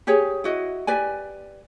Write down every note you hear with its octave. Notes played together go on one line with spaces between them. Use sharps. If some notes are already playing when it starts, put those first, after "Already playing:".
G4 G#4 C#5 G#5
E4 F#4 D#5
G4 B4 D5 G#5